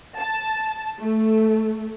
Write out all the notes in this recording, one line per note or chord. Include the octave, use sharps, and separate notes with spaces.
A5
A3